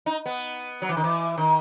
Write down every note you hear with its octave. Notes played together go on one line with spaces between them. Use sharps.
D#4
B3
F#3
E3
D#3
E3
D#3